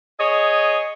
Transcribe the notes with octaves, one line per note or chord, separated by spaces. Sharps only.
G#4 C#5 D#5